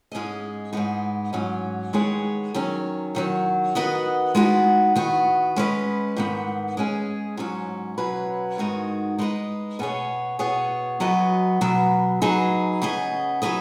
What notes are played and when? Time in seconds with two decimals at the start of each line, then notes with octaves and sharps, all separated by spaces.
0.12 G#2 G#3 C#4 G#4 D#5
0.73 G#2 G#3 B3 D#4
1.33 G#2 F#3 C#4
1.93 D#3 G#3 B3 G#4 C#5
2.54 D#3 F#3 C#4
3.15 F#2 D#3 F#3
3.75 D#3 B3 F#4 B4 D#5
4.35 G#3 B3 D#4 F#4
4.96 D#3 B3 F#4
5.56 G#3 C#4 B4 D#5
6.17 G#2 D#3 B3
6.77 G#3 C#4 G#4
7.37 G#2 F#3 C#4
7.98 B2 F#3 C#4 B4
8.58 G#2 D#3 G#3 D#4 F#4
9.19 G#3 D#4 B4 D#5
9.79 B2 B3 G#4 C#5
10.39 B2 B3 G#4 C#5
11.00 F#2 F#3 B3 F#4 D#5
11.61 B2 F#3 B3
12.22 F#3 D#4 G#4 B4
12.82 C#3 B3 G#4 D#5
13.42 F#3 D#4 G#4 B4 D#5